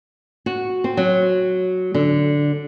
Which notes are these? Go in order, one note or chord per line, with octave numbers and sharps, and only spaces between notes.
F#4
C4
F#3
D3